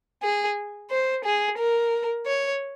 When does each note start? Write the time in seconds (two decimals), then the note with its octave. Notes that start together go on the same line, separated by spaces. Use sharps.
0.23 G#4
0.91 C5
1.25 G#4
1.58 A#4
2.27 C#5